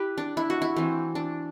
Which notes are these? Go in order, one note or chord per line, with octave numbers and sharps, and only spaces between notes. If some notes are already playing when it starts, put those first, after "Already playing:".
Already playing: E4 G4 B4
D4
E4
F#4
E4
E3 A3 C4
D4